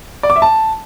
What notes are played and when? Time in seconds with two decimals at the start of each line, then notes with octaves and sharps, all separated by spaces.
0.23 D5
0.30 D6
0.36 E5
0.42 A5